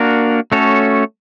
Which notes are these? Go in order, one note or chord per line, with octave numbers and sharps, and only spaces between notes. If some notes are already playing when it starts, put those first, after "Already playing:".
Already playing: A#3 D4 F#4 A#4
A3 C#4 F#4 A4 C#5